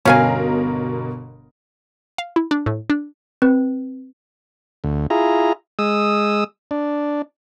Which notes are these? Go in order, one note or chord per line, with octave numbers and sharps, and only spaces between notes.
G1 B2 C#4 A#4 F5 G#5
F5
E4
D4
A2
D4
C4 B4
D2
E4 F4 G#4 A#5
G#3 D#6 E6
D4